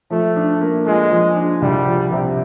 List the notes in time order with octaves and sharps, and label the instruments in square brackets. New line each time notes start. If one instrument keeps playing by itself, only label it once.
[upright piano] F3 [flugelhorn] A3
[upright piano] D4
A#3
[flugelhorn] G#3 [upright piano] F4
[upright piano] F3
D4
[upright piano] C2 [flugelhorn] G3
[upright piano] F3
C3